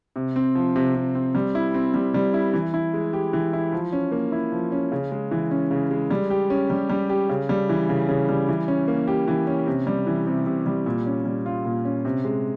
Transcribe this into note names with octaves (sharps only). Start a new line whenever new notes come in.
C3
C4
F3
C3
C3
C4
G3
E4
C4
G3
G3
E4
E3
E4
G#3
G4
E3
E4
F3
C#4
A#3
E4
F3
C#4
C#3
G#3
E3
C#4
C#3
G#3
G3
G4
C#4
G3
G3
G4
C#3
G3
E3
C#3
C#3
G3
E3
C#4
A#3
G4
E3
C#4
C3
G3
E3
C3
C3
G3
A#2
C#4
G3
F4
A#2
C#4
C3
G#3